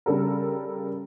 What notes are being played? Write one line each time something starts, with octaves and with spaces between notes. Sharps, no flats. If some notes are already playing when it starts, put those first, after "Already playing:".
C#3 G3 A4 A#4